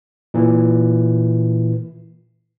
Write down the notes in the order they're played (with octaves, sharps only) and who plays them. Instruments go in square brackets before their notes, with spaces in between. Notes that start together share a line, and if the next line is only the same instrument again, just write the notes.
[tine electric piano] A#2 E3